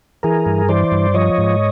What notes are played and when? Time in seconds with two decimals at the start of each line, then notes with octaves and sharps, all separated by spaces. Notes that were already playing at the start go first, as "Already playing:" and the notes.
0.23 E3 G#4 A#4
0.46 G2
0.69 E3 C5 D5
0.92 G2
1.14 F3 C#5 D#5
1.38 G#2